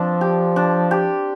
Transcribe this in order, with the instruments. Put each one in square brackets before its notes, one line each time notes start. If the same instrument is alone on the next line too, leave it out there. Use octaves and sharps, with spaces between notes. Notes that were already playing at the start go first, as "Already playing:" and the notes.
Already playing: [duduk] F3 [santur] C4 D4
[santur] G4
D4
G4